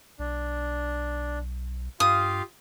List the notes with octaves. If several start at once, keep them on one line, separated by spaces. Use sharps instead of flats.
B1 D4
G2 F4 G4 F5 D#6